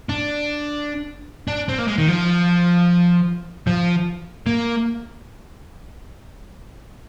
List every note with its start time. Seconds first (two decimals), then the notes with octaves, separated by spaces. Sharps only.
0.09 D4
1.48 D4
1.69 C4
1.79 A#3
1.88 G#3
1.98 D#3
2.08 F3
3.67 F3
4.47 A#3